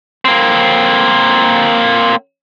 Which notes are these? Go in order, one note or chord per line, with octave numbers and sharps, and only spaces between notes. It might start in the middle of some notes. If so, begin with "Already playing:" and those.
A#3 C4